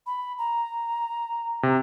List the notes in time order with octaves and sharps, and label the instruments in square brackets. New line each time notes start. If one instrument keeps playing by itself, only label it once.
[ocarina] B5
A#5
[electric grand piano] C3